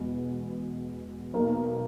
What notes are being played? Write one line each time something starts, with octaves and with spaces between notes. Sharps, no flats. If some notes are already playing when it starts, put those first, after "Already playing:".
Already playing: E2 B2 G#3 B3
B1 B2 A#3 D#4 A#4